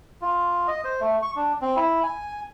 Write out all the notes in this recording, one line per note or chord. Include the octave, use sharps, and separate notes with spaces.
F4
D#5
C5
A3
C#6
D4
C4
E4
G#5